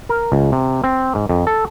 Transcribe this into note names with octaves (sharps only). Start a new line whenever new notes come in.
A#4
C#2
C3
C4
G#2
F2
A4